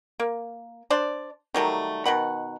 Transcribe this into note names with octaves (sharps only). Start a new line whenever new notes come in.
A#3
D4 C5 D5
D#3 F#3 G3 A3
B2 D#3 F#5 B5